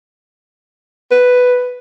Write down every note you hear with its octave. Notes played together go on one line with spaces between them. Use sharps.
B4